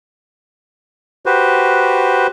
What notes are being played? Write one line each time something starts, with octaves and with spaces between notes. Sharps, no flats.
F#4 G4 B4 C5